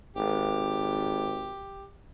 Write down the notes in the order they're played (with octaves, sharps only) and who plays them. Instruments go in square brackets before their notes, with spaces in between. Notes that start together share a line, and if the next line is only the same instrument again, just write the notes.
[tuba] G#1 [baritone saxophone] G4